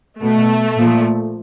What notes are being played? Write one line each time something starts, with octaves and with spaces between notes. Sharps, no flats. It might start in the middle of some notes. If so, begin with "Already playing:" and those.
B2 A3
A#2 F3